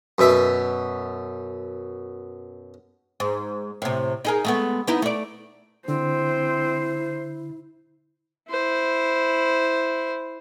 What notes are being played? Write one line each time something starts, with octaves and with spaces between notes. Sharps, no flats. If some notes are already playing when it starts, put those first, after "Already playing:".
F#2 B2 E5
G#2
A2 C3
D#4 G#4 A#4
G#3 A3 B3
B3 D#4 E4
A3 D5
D3 C4 E4 C5
E4 C5